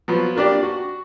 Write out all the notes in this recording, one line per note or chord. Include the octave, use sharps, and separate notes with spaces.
F3 F#3 B3
A#3 D4 G4 D5
F#4